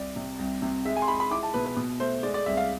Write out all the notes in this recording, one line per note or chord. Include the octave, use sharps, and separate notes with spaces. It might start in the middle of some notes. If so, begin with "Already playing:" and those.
Already playing: C2 D5
C3
C2
C3
G#3 E5
G#5
C6
G#3 B5
B5
E4 D6
A5
B2 B4
B4
B2
A3 C5
G#3 D5
D5
C2 E5
F5